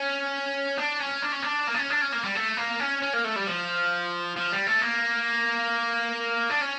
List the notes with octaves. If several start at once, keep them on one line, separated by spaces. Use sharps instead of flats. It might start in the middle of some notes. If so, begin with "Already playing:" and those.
Already playing: C#4
D4
C#4
D4
C#4
D4
A#3
D4
C#4
D4
C#4
A#3
G3
A3
A#3
C#4
C#4
A#3
A3
G3
F3
F3
G3
A3
A#3
D4
C#4